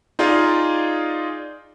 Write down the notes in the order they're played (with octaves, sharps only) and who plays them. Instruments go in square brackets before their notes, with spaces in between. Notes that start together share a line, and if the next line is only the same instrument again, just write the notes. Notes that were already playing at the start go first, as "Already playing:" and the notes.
[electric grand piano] D#4 F4 G#4 D5 D#5 F5